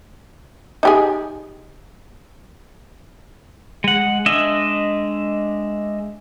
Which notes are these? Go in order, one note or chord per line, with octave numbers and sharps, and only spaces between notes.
D#4 G4 G#4
G#3 F#5
G#3 D4 D#5 E5